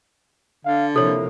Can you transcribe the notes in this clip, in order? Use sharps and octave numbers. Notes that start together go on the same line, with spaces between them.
D3 F5
C3 F3 A#3 E4 A4 C#5